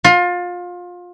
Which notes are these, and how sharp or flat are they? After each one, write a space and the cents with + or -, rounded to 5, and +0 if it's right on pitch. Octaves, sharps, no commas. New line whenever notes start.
F4 +25